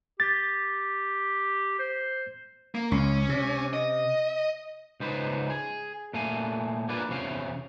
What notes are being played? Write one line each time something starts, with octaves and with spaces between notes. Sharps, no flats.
G4 A6
C5
A#3
C#2 C#4
C3
D#5
C#2 D#4 B4 C5
G#4
A#2 A3 F5 G#5
A#3 D4 F4 G#4 B4
E2 C3 C#4 F5